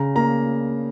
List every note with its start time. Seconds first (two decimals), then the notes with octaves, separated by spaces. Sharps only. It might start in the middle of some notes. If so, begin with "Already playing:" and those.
Already playing: C#3 A#5
0.15 A#3 A#5